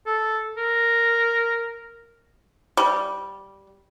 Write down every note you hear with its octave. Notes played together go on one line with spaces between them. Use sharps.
A4
A#4
G3